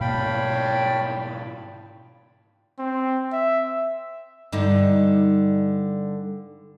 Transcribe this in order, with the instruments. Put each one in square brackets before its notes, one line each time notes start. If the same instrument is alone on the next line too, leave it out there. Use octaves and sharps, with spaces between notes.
[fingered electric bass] G#2 B2 A#3 [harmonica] C#5 F5 A5 [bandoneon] G5 B5
[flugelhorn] C4
E5
[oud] G2 D3 D#4